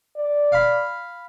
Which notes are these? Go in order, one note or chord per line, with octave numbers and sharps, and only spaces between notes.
D5
F5 B5